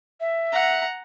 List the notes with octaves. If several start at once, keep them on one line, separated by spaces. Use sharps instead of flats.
E5
F#5 A#5